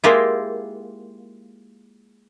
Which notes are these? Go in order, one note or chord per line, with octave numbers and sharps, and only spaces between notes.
G#3 A#3 E4 F4 G4 G#4